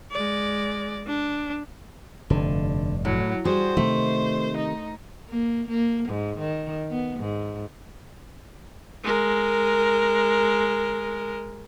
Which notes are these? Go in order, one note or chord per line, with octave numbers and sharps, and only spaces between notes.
G#3 D5
D4
F1 G2 D3
A2 F#3
G3 F#4 G#4 C5
C3 D#3 A3
D#4
A#3
A#3
G#2
D#3
B3
G#2
G#3 A#4